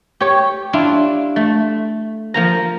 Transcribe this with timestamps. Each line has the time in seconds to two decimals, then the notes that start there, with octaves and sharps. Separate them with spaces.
0.20 G4 C#5
0.73 D4 E4 F4
1.36 A3
2.34 F3 A#3 A#5